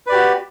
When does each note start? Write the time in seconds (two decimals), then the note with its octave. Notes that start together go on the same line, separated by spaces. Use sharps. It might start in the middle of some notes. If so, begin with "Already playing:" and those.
0.07 B4
0.09 D5
0.12 G4
0.14 F#4